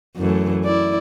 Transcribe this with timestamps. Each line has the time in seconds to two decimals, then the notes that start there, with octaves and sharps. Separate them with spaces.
0.17 F#2 E3 A3
0.65 E4 D5